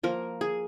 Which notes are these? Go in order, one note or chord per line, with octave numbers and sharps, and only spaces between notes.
F3 A#3 A#4
G#4